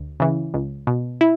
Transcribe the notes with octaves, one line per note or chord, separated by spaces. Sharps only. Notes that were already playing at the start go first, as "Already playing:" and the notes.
Already playing: D2
C#3 E3
C#2
B2
E4